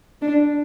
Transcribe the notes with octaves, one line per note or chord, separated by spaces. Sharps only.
D4